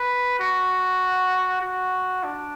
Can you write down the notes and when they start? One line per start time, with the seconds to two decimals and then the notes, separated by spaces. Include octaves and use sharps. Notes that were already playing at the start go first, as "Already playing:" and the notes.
Already playing: B4
0.39 F#4
1.61 F#4
2.23 D4